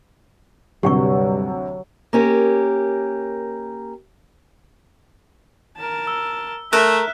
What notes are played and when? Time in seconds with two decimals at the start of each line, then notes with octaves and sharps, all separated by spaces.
0.83 D2 G2 C3 F#3 G4 F#5 C#6
2.13 A#3 C#4 G4 A#4
5.78 A#4 A5
6.07 E6
6.73 A3 A#4 E5 F6 F#6